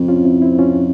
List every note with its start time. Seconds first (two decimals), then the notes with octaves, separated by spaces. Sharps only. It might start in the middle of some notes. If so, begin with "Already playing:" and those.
Already playing: F2
0.08 C#4 F4
0.25 C4 E4
0.42 C4 E4
0.58 C#4 F4